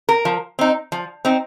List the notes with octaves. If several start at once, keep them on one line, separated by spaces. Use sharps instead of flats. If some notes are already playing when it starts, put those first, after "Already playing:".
A#4
F3
C4 D#4
F3
C4 D#4